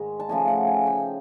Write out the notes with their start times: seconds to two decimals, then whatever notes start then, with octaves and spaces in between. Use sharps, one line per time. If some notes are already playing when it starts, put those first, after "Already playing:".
Already playing: G#2 D#3 G#3
0.20 A5
0.29 C#3 F3 A3 G#5
0.48 F#5
0.67 G#5
0.87 G5